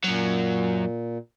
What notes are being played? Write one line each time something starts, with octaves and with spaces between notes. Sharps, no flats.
F#2 A#2 F#3